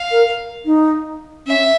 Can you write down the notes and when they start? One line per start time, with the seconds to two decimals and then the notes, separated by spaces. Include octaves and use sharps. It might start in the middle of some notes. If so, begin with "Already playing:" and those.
Already playing: F5
0.11 A#4
0.65 D#4
1.46 C#4 E5